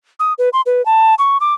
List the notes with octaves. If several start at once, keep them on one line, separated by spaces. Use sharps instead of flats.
D#6
B4
C6
B4
A5
C#6
D6